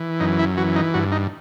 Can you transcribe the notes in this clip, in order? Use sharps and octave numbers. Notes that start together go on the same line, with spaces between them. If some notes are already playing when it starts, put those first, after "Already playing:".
Already playing: E3
F#2 D#4
E4
E3 F#4
D#4
G2 F#4
D#4